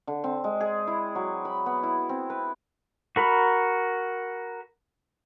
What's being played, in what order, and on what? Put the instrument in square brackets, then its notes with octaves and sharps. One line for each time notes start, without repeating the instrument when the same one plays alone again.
[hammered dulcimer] D3
C4
G#3
G#4
E4
F#3
B5
B3
E4
C4
B4
[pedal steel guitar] F#4 A#4 B5